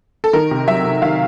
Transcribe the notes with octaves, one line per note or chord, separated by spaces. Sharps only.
A4
D#3 A#4
C3
F#3 E5
C3
D#3 F5